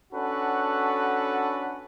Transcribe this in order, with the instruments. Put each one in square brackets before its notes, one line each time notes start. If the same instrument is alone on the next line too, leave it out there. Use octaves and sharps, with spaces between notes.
[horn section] C#4 D4 F#4 A4 B4 F#5